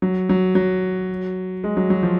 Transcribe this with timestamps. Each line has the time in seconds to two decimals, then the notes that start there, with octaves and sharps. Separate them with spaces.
0.02 F#3
0.29 F#3
0.55 F#3
1.64 G#3
1.77 F#3
1.90 F#3
2.03 F3